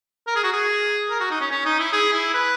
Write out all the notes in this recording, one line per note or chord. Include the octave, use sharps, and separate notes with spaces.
A#4
G#4
F#4
G#4
A#4
F#4
D#4
C#4
C#4
D#4
E4
G#4
E4
B4